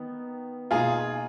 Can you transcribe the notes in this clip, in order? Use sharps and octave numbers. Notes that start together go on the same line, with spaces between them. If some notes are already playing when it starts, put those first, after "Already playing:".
Already playing: D#3 B3
B2 A#3 D#4 F4 G#4